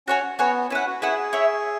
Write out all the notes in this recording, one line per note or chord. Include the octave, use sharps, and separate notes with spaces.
C#4 F#4 C#5 G#5
B3 F#4 C#5 G#5
C#4 E4 B4 F#5
F#4
E4 G#4 B4 F#5
E4 C#5 E5